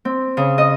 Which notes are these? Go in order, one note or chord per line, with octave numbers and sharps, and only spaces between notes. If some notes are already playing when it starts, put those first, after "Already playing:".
C4
C#3
D#5